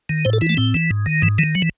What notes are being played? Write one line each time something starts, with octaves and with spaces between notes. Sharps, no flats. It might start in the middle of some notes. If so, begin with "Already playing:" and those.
D#3
A2 C5
A4
E3 E4
A3
A2 C4
E3
G#2
D#3
G#2 E3
D#3 E3
F#3
E3